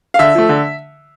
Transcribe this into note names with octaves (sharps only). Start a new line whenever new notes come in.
F5
D3 E5
F3 A3
D3